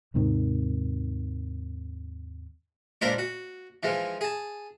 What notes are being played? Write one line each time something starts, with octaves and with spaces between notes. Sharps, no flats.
D#2 G#2 C3 D#3
C#2 A#2 D4 A#4 C5 B5
F#4
E3 F3 G#3
G#4 A5